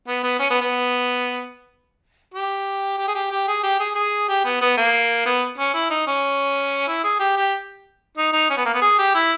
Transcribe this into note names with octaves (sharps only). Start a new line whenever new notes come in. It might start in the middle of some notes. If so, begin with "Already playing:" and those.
B3
B3
C#4
B3
B3
G4
G4
G#4
G4
G4
G#4
G4
G#4
G#4
G4
B3
B3
A#3
B3
C#4
E4
D#4
C#4
E4
G#4
G4
G4
D#4
D#4
C#4
B3
A#3
B3
G#4
G4
E4